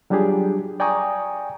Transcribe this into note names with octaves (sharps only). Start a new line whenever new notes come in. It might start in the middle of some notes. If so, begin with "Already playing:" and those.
F#3 G3 D4 F4 G4 G#4
D5 G5 G#5 A#5 C#6 D#6